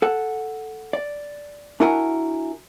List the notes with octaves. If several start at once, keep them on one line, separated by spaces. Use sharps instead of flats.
A4 F#5
D5
D4 E4 F#4 A#4 F#5 G#5